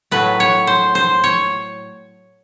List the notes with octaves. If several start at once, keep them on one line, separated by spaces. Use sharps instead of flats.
A2 F#3 A3 B4
C#5
C5
C5
C#5